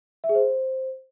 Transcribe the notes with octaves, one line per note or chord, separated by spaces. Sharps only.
E5
G#4
C5